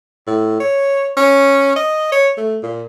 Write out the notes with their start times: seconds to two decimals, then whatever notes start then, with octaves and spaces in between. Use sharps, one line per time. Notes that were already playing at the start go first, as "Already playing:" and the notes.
0.27 A2
0.60 C#5
1.17 C#4
1.76 D#5
2.12 C#5
2.38 A3
2.63 A#2